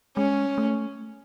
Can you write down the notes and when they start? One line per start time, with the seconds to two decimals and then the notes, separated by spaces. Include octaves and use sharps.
0.16 G#3 C#4
0.58 A3